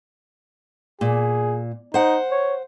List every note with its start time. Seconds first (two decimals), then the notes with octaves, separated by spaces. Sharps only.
1.01 A#2 G#4
1.94 D#4 C5 F#5
2.31 C#5